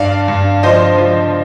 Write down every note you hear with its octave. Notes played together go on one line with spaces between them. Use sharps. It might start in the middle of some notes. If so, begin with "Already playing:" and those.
Already playing: G2 D5 F5
G2
F3 C5 D#5
F3